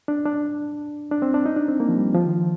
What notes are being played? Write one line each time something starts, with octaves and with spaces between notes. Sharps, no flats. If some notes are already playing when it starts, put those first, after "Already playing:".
D4
D4
D4
C4
D4
D#4
D4
C4
A#3
F3
G3
F3
D#3